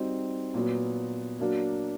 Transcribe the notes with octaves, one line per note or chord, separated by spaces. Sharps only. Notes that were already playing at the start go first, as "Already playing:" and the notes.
Already playing: G3 C4 D#4 F#4
A#2 F#3 B3
F#3 A#3 D4 F#4